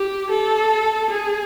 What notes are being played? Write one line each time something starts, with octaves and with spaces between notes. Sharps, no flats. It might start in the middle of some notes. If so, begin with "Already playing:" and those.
Already playing: G4
A4
G#4